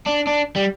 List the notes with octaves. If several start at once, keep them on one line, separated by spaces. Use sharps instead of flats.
D4
D4
G3